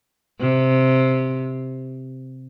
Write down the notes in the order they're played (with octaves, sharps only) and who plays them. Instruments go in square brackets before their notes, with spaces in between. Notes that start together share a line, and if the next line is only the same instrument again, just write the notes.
[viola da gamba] C3